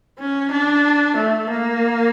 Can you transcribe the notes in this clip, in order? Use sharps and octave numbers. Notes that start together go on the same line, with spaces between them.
C#4
D4
A3
A#3